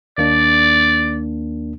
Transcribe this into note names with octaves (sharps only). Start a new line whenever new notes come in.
D#2 A#3 D4 D5